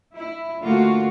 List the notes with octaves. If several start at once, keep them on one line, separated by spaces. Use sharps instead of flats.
E4
D3 A3 A#3 F4 F#4